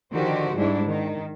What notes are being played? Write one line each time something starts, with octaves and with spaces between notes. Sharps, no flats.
D3 D#3 F3 F#4 G4 C5
G#2 G3 G#3 D4 E4
D#3